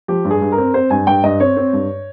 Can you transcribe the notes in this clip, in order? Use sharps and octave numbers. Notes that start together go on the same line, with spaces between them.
F3 G4
G2
G#4
G2
A#4
C4
C4 C5
G2 G#5
G2 G5
G2 D#5
C4 C#5
C4
G2